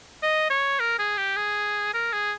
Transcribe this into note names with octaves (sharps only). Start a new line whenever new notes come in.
D#5
C#5
A#4
G#4
G4
G#4
A#4
G#4